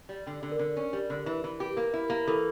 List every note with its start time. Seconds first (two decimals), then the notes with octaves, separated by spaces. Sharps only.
0.09 G3
0.26 D3 G5
0.43 D3
0.52 A#4
0.59 D3
0.77 C#4
0.93 G3
1.10 D3
1.26 E3
1.44 E3
1.60 G4
1.77 A#3 A#4
1.93 E4
2.10 A#3
2.27 E3 A4